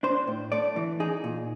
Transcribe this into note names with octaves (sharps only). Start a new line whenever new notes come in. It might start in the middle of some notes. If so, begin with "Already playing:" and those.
D4 C5
A2
A3 D5
E3
D#4 G#4
A#2